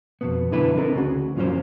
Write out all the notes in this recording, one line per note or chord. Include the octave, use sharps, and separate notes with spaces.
F2 B2 B3
F#2 B2 D3 E4 B4
C4 D4 D#4 A4 A#4
D2 C#3 F#4
F#2 A#2 F3 F#3 C#4 C5